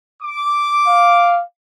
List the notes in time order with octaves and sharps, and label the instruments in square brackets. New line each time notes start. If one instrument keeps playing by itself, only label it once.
[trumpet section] D6
[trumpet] F5